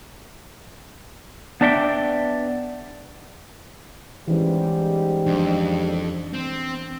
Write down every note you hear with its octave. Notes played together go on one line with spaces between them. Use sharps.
B3 D4 D5 E5 F#5 G5
G#2 E3 G3 C#4 G4
F2 D4
C4